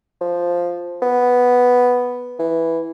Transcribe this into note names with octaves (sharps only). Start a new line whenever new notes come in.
F3
B3
E3